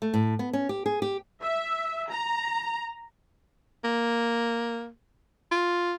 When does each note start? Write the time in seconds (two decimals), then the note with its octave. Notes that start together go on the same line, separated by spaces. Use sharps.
0.02 A3
0.14 A2
0.39 B3
0.53 C#4
0.69 G4
0.86 G#4
1.02 G4
1.42 E5
2.10 A#5
3.84 A#3
5.52 F4